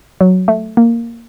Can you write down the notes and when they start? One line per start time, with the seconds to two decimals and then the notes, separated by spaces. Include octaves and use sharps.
0.21 F#3
0.48 A3
0.77 A#3